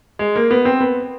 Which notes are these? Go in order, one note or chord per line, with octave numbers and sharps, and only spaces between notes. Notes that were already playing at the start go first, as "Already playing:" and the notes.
G#3
A#3
B3
C4
B3